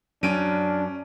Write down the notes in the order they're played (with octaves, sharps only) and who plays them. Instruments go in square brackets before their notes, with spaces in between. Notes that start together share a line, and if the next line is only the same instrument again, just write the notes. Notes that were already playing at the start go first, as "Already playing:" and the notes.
[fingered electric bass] F#2 [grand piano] C#4 D7 D#7 [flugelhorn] D4